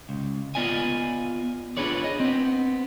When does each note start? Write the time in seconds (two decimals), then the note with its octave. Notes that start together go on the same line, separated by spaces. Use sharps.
0.09 C#2
0.55 B3 F4 D5 D#5 G#5
1.77 D4 F4 G#4 B4 C#5 D5
2.04 D#5
2.20 B3 C4